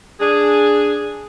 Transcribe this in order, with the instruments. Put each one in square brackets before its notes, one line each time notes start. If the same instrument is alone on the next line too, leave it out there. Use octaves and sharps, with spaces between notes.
[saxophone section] D4 G#4